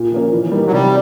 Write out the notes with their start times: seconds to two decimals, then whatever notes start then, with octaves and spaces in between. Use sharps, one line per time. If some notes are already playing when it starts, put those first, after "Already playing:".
Already playing: A#2
0.12 F3 A#3 C#4
0.33 E3
0.52 G3 A#3 D#4
0.66 F#3
0.72 C3 G3